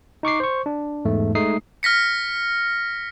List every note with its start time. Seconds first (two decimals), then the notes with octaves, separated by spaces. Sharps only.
0.23 D#4 C#6 D6 C7
0.40 C5 C#6
0.66 D4
1.05 E2 G#2 A3
1.35 G#3 A3 D#4 D#6 C7
1.83 F6 A#6 B6 C#7